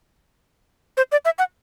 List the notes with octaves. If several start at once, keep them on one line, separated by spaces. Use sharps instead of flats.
C5
D5
E5
F#5